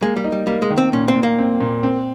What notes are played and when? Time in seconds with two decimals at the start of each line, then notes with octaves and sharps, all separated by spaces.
0.01 G#3 A#3
0.16 G3
0.24 D#4
0.32 G3
0.47 G3 A#3
0.62 G#3
0.70 D#3
0.78 C4
0.93 A#2 C#4
1.08 C4
1.15 A#2
1.23 A#3
1.38 C4
1.60 A#2
1.83 C4